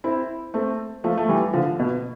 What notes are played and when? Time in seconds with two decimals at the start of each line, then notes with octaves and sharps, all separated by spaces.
0.04 C4 E4
0.54 A3 C4
1.04 F3 A3
1.18 A3
1.29 E3 G3
1.53 D3 F3
1.79 B2